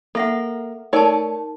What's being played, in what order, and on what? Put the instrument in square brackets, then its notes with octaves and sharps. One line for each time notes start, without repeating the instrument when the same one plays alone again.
[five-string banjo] A#3 [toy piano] A4 E5 F#5
[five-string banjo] A3 C#5 D5 [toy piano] D#4 A#4 A5